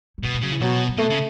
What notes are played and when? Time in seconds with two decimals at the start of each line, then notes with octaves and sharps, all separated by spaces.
0.18 F#3
0.24 B2 A3
0.34 A3
0.42 C#3 F#3
0.52 E3
0.61 B2 F#3
0.89 F#3
0.98 B2 A3
1.10 C#3